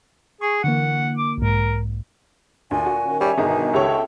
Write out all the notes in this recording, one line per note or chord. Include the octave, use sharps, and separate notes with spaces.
G#4 C#6
D3 E3 A#3 F#5
D6
B1 G#2 A#4
D2 A#2 G#5
F#4
D#3 C#4
G3 C#5 E5 G#5
G1 B2 D#3 G#4 A#5
C#2 G4 A4 C#5 E5 G5